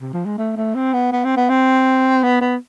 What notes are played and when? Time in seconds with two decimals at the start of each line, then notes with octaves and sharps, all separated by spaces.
0.01 C3
0.13 F3
0.26 G#3
0.38 A3
0.57 A3
0.75 C4
0.94 B3
1.12 B3
1.25 C4
1.37 B3
1.49 C4
2.23 B3
2.41 B3